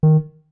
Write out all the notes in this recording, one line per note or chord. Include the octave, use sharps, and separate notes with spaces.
D#3